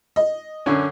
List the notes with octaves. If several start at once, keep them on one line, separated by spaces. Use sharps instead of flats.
D#5
F#2 D3 C#4